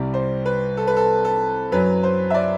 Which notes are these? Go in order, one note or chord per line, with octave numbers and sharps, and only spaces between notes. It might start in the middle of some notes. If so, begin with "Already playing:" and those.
Already playing: C2 C3 G3 D5
C5
B4
A4
B4
A4
A4
F#2 F#3 B4
C5
E5
D5